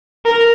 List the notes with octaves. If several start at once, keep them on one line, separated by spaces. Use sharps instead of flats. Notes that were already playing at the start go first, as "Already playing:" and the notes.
A#4